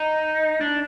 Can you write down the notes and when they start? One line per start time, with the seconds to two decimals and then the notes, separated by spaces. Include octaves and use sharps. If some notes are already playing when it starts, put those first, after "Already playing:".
Already playing: D#4
0.61 D4